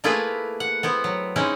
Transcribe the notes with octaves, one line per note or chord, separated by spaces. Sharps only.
A3 A#3 E4 F4 G#4 B4
F#5
B3 C4 E4
F#3
G#3 C4 C#4 D#4 E4